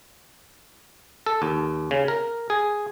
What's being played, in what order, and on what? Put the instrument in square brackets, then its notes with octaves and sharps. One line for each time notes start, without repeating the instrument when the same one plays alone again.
[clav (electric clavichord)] A4
D#2
C#3
A#4
G#4